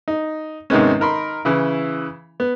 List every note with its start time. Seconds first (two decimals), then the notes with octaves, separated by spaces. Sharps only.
0.08 D#4
0.70 G#2 C3 D#3 G#3 B3 C#4
1.00 D#4 A#4 B5 C6
1.45 C#3 E3 E4
2.40 B3